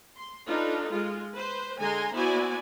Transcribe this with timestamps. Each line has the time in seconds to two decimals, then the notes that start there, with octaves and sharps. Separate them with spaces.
0.17 C6
0.47 D4 D#4 F4 A4 B4
0.92 G#3 F4
1.33 B4 C5
1.79 D3 G#3 G#5 A#5 C6
2.14 B3 E4 F#4 C5 D5 G#5